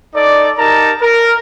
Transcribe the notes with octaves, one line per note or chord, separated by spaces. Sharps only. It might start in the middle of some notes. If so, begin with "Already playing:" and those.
D#4 A4 D5
D#4 G4 A#4 A5 A#5
A#4